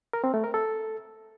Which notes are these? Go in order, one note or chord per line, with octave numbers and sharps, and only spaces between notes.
A#4
C4
A3
A#4
A4